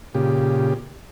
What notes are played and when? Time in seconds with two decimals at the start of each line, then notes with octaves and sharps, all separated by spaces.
0.15 A#2 C#3 G4